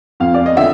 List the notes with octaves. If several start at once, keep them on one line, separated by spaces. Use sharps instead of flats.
F2 F5
D5
D#5
D3 E5